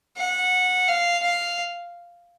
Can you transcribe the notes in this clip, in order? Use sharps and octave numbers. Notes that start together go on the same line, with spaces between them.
F#5
F5
F5